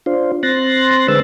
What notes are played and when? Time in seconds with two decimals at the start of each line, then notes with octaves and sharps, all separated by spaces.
0.06 D4 F4 C5
0.43 C4 C6 F#6 A6 A#6
1.08 D3 G#3 B4 C5 E6 A6